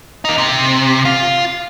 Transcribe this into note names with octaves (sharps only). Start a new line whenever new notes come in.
A#3 D#4
C3
F4